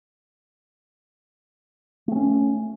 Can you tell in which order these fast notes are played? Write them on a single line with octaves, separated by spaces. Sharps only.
A3 C4 C#4